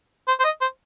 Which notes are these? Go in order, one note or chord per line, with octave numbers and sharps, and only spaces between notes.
C5
C5
D#5
C5